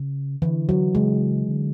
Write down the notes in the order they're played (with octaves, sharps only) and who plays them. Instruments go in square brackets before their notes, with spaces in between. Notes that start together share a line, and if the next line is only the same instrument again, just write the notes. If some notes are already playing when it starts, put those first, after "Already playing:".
Already playing: [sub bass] C#3
[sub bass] D3 [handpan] E3
[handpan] F#3
[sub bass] C#3 [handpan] G#3
[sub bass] D3